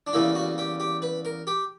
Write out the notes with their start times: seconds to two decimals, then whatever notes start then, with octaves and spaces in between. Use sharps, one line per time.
0.07 D4
0.13 E2 C#3 G3 A#3 E4
0.35 F#4
0.58 G4
0.80 G4
1.02 B4
1.25 A#4
1.47 G4